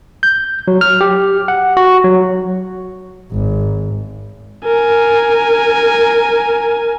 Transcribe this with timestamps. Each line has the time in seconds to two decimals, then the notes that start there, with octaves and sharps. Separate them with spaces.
0.23 G6
0.68 F#3
0.81 F6
1.01 G4
1.48 F#5
1.77 F#4
2.04 F#3
3.33 G#1
4.65 A#4 G#5